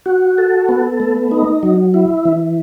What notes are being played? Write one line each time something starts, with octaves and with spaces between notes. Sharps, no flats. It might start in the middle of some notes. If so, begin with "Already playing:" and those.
F#4
A4
B3
A3
D#4
F#3
E4
E3